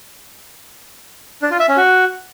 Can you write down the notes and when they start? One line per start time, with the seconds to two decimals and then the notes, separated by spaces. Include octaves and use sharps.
1.42 D4
1.51 F4
1.60 E5
1.68 C#4
1.77 F#4